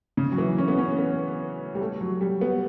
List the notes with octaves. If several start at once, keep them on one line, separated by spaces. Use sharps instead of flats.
C#3
F#3
E3
C#4
B3
C#4
B3
G3
A3
F#3
G3
B3